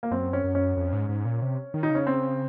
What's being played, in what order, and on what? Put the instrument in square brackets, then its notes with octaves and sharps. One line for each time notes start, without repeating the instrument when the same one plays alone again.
[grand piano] A#3
[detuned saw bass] F#2 [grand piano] C4
[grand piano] C#4
[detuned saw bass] F#2
[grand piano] C#4
[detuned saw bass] F2
G#2
G#2
A#2
C3
D#3
[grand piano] D#4
[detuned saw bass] C#3 [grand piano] C#4
[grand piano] C4